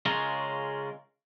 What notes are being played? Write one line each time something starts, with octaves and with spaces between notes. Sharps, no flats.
C#3 G#3 C#4 F4 A#4